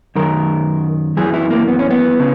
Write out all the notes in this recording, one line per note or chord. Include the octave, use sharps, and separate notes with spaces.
F#2 D#3 A#4
F#2 E3 G#4
E4
A#3
B3
C#4
B3
C#3